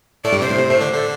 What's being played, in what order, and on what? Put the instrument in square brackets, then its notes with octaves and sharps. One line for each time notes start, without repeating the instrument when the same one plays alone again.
[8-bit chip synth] A2 A3 [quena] D5
[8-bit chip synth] G2 G3
[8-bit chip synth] C3 [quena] C5
[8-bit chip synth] A2
C3
A2 A3
D3 D4
[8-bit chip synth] D3 D4 [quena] A4